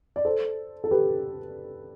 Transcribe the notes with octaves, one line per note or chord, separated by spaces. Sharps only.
D5
A4 C5
A4
G4 B4